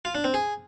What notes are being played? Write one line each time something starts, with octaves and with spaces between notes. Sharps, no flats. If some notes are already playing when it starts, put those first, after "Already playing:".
F4
D4
C4
G#4